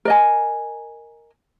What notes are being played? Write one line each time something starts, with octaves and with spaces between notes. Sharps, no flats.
A#4 D#5 G#5